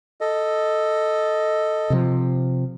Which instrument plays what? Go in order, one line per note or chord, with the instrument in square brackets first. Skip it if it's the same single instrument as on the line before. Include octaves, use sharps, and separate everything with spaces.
[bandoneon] A4 D#5
[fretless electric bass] C3 F3